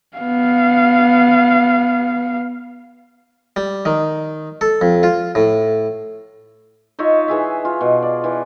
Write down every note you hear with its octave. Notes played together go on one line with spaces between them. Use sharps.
B3 F5
G3
D#3
A4
F2
F4
A2
D#4 F4 C#5 E5
E3 G#4 E5
F4
B2
D5
E3